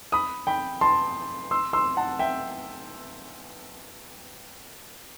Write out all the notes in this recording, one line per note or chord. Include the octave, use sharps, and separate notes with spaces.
B5 D#6
G5 B5
A5 C6
C6 E6
C6 E6
F#5 A5
E5 G5